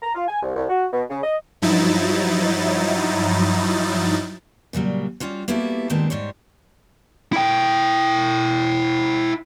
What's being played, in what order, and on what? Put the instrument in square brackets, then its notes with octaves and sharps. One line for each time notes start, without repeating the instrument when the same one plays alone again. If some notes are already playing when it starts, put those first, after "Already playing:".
[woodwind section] A#5
F4
G#5
C2
C2
F#4
B2
C#3
D#5
[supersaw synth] G2 F3 F#3 D#4 E4 A6
[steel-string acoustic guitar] A#2 C#3 F#3 G3
G3 C#4 F4 F#4
A#3 B3 E4 F#4 G4 A4
G2 A#2 D#3 G#3 C4 A5
G#2 G3 C5 C#5
[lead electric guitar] E4 G5